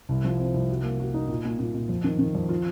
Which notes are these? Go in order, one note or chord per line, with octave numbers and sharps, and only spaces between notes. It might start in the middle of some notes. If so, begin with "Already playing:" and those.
C2
F3
C4
C2
F#4
A#3
F#4
D#4
A#2
A#2
A#2
A#2
F2
D#3
D#3
F2
F4